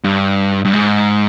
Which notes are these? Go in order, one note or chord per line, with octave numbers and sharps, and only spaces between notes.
G2
G2
G#2